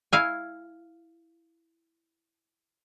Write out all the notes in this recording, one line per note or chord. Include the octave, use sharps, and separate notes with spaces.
E4 F5 G#5